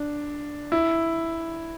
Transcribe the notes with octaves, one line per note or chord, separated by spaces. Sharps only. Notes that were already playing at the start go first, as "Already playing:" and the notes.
Already playing: D4
E4